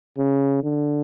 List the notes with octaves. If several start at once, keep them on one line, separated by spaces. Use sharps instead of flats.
C#3
D3